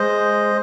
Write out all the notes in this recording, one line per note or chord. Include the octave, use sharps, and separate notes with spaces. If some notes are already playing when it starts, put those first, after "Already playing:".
Already playing: G#3 C5 D#5